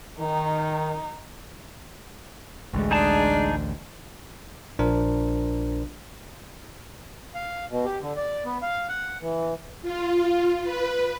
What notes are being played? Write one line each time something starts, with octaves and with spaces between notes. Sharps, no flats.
D#3 D#4
A1 D2 G#3
D4 D#4 G#4 A5
A#1 D4 F4 A#4 C5
F5
B2
G4
D3
D5
B3
F5
F#5
E3
F4
B4